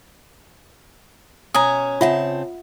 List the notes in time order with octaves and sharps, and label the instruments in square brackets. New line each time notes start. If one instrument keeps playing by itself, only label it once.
[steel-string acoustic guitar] B2 C#4 [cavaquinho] G#5 A#5 [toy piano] D#6
[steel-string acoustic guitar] C#3 C4 A5 [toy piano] F4 E5 F#5